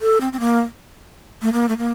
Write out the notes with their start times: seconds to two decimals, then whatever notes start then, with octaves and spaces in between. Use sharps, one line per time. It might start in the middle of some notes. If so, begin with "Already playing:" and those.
0.02 A4
0.21 C4
0.33 C4
0.40 A#3
1.42 A3
1.53 A#3
1.69 A3
1.78 A#3